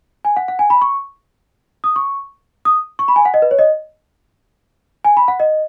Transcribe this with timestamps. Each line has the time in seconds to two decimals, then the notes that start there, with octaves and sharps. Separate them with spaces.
0.25 G#5
0.36 F#5
0.48 F#5
0.59 G#5
0.70 B5
0.82 C#6
1.84 D#6
1.96 C#6
2.65 D#6
2.99 C#6
3.08 B5
3.16 G#5
3.25 F#5
3.34 D#5
3.42 B4
3.51 C#5
3.59 D#5
5.05 G#5
5.17 B5
5.28 F#5
5.40 D#5